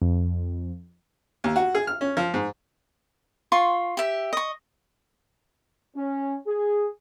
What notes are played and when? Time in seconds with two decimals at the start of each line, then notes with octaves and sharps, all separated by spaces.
0.02 F2
1.44 D#2
1.56 F#4
1.75 G#4
1.87 F6
2.01 C#4
2.17 F3
2.34 G#2
3.52 F4 C6 C#6
3.97 G4 E5
4.33 D#5 C#6
5.95 C#4
6.46 G#4